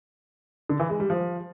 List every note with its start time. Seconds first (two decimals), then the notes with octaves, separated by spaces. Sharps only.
0.69 D3
0.80 E3
0.90 G#3
1.00 G3
1.10 F3